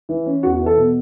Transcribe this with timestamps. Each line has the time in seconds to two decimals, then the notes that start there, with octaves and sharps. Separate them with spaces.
0.09 E3
0.26 C#4
0.43 E2 F#4
0.55 F#4
0.60 E3
0.66 A4
0.77 B2